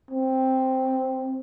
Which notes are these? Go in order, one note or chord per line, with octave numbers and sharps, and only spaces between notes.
C4